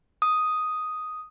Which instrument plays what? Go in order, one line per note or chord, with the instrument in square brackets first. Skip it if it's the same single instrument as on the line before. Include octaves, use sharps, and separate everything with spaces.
[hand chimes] D#6